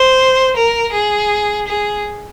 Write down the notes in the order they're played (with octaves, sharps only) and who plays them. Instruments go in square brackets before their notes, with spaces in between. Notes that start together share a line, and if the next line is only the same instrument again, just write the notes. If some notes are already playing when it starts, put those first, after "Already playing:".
Already playing: [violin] C5
A#4
G#4
G#4